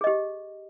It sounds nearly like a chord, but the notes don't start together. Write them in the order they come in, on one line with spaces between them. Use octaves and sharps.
G#4 D#5 G4